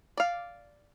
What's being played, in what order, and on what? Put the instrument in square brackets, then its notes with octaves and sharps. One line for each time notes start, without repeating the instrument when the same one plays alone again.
[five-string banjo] D5 F5